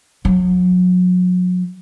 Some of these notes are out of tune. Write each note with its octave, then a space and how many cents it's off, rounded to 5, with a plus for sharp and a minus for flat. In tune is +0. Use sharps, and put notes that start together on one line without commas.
F#3 -35